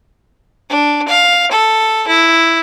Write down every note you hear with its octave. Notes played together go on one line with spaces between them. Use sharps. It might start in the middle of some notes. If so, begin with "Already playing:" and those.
D4
F5
A4
E4